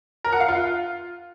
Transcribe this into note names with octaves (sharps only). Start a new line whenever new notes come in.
A#4
F#5
F5
F4